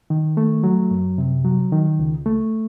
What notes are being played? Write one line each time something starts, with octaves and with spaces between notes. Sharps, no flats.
D#3
A3
F#3
F#2
C3
F#3
D#3
C#2
A3